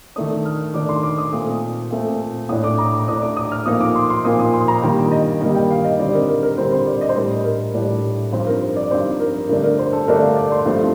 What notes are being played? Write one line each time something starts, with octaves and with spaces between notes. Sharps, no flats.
D#3 A3 D4 D#6
F6
D#3 A3 D4 D6
C6
D6
D#6
A#2 A3 C4 D#6
A#2 A3 C4
A2 A3 D4 D#6
D6
A#5
D6
A2 A3 D4 D#6
D6
D#6
F6
A#2 F3 A#3 D#4 D#6
D6
C6
C6
A#2 F3 A#3 D#4 D#6
D#6
C6
A#5
G2 D#3 G3 A#3 D#4 G5
D#5
G2 D#3 G3 A#3 D#4 D#5
G5
F5
D#5
D3 G3 C4 D5
A#4
A#4
A#4
D3 G3 C4 C5
C5
D5
D#5
C5
A2 G3 D4 A#4
A#4
A2 G3 D4
G2 F3 C4 D#4 C5
A#4
C5
D5
G2 F3 C4 D#4 C5
A#4
G2 D3 A3 D4 A#4
A#4
C5
A4
G2 D3 A3 D4 A#4
F5
D5
C6
G2 F3 A3 C4 D#4